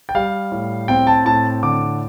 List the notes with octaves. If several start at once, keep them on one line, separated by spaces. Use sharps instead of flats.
G5
G3 F5
A2
C4 G5
A5
A2 A5
D3 D6